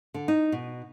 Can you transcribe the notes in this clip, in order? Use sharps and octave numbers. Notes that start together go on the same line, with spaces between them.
D3
D#4
B2